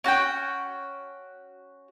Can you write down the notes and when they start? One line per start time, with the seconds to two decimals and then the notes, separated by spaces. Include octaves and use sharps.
0.04 C#4 F#4 F#5 G5